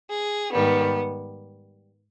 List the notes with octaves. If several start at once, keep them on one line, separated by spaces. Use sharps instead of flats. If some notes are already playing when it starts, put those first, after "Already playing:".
G#4
G#2 D#3 G3 B3